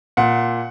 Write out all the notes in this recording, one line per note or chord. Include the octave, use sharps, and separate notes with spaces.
A#2 F#5